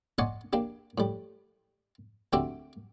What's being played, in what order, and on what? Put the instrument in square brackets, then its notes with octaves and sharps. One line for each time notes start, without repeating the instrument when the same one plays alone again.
[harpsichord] D5 D#5 F#5 G#5 C6 C#6
A#3 D4 G4
A2 G3
D2 C4 D4 F#4 G4 E5